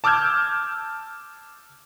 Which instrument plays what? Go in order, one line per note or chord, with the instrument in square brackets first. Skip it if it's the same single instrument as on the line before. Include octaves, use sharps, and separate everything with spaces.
[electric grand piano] A5 D6 E6 F6 G6 G#6